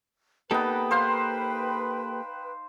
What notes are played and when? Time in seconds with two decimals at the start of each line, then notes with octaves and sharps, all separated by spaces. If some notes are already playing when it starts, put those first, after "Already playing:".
0.51 A#3 B3 D#4 G4 A4 B4 G5
0.91 C5 F5 C6